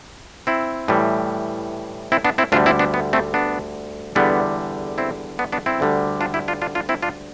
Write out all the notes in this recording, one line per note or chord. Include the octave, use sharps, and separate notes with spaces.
C4 E4
A2 E3 G3
C4 E4
B3 D4
C4 E4
D2 D3 G3 D4 F4
C4 E4
B3 D4
B3
A3 C4
B3 D4
E2 D3 G3 B3 D4
C4 E4
B3 D4
B3 D4
C4 E4
D2 D3 G3
D4 F4
E4 G4
D4 F4
D4 F4
D4 F4
C4 E4
D4 F4